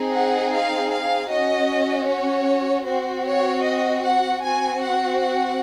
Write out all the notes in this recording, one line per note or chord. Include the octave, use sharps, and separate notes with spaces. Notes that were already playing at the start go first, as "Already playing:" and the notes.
Already playing: C4 D#4 G#4
F#5
F5
F5
C#4 F#4 D#5
C#5
C4 F#4 C5
C#5
D#5
F#5
C4 F#4 G#5
F#5
F#5